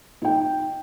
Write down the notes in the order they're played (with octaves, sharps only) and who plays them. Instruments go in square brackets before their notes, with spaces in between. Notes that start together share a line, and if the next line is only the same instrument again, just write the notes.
[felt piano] D#4 G5